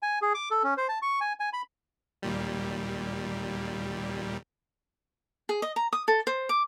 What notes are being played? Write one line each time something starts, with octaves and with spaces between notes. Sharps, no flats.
G#5
G#4
D6
A4
C#4
C5
A5
C#6
G#5
G#5
B5
D#2 A#2 G3
G#4
D#5
A#5
D#6
A4
C5
D6